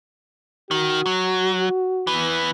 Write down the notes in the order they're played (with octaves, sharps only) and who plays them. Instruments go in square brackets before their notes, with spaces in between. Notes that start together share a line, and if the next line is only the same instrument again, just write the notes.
[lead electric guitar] D#3 [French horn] F#4
[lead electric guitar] F#3
E3 B3